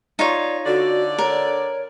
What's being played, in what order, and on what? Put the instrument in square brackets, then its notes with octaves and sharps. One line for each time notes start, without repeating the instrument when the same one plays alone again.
[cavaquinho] D#4 F4 C#5 [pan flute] D5
[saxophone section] D3 D5 [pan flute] F#4
[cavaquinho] A#4 [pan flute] C#5